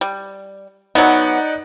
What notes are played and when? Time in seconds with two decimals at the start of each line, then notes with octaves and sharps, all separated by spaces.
0.01 G3
0.95 F#3 B3 D#4 D5 F#5